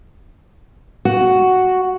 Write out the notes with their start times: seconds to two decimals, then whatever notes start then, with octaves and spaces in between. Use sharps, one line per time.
1.05 F#4